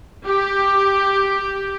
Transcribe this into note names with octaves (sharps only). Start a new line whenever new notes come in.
G4